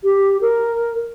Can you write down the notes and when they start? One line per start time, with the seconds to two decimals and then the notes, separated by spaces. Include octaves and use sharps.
0.04 G4
0.41 A#4